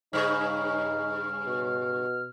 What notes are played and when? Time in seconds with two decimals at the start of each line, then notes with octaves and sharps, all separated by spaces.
0.13 G2 C#3 D#4 F6
1.47 B2